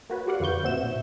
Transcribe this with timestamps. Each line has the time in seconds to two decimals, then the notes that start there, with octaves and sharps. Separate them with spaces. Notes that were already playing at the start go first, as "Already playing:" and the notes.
0.10 A#3 F#4 B4 C#5
0.27 F#4 G4 D5 F5 F#5
0.40 F2 D3 F4 B4 C#6 G6
0.63 A#1 A#2 C4 F#4 E5 E7
0.84 A2